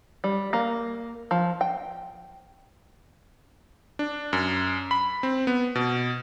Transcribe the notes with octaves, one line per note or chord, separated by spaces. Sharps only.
G3
A#3
F3
G5
D4
F#2
B5
C4
B3
B2